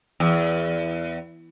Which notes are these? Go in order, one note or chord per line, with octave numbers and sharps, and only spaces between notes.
E2